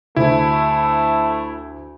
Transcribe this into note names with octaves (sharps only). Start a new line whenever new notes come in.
D2 A3 E4